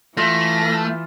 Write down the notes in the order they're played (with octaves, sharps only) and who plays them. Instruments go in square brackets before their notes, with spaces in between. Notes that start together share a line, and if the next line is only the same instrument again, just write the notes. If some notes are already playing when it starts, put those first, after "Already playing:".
[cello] E3 [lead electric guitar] A3 [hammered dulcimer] F4 E5 [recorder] A#6